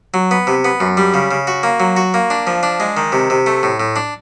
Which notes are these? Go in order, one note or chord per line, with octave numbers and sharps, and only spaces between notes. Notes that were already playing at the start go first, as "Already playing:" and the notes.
F#3
B3
C3
B3
F#2
G3
C#3
C#3
F#4
A#3
F#3
F#4
A#3
D4
F3
D4
G#3
D#3
C3
C3
A3
A2
A2
D4